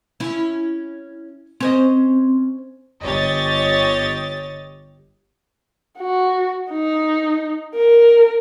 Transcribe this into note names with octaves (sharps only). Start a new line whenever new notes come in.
C#4 E4
C4 C#4 C5 D#5
G1 G4 C#5 D#5 A6
F#4
D#4
A#4